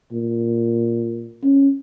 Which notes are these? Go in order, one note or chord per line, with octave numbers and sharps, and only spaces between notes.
A#2
C#4